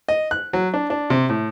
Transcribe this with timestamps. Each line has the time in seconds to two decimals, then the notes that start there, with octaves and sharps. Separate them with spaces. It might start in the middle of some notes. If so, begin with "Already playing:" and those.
0.09 D#5
0.31 F#6
0.53 F#3
0.74 D4
0.90 D4
1.10 C3
1.29 A2